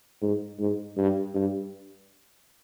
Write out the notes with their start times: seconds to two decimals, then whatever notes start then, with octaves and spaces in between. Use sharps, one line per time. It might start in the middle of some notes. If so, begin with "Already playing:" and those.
0.22 G#2
0.59 G#2
0.97 G2
1.34 G2